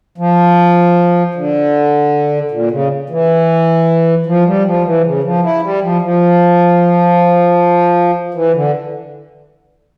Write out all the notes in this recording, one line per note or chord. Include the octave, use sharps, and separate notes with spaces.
F3
D3
A#2
C#3
E3
F3
G3
F3
E3
C#3
F3
E4
G3
F3
F3
E3
D3